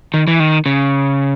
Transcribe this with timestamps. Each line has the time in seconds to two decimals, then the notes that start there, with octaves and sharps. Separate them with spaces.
0.14 D#3
0.28 E3
0.40 D#3
0.66 C#3